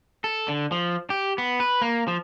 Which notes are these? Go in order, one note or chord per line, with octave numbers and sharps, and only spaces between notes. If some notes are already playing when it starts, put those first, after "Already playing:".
A4
D3
F3
G4
B3
B4
A#3
F3